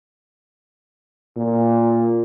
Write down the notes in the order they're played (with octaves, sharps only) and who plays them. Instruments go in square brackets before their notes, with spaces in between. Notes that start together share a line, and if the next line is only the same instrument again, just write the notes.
[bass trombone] A#2